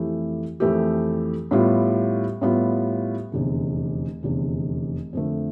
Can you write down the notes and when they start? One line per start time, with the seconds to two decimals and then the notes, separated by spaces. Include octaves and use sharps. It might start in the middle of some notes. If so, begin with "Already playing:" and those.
Already playing: F2 E3 A3 E4 G4
0.60 F2 E3 A3 E4 G4
1.51 A2 G3 B3 F4
2.41 A2 G3 B3 F4
3.32 F1 E2 D3
4.23 F1 E2 D3
5.13 F2 D3 A3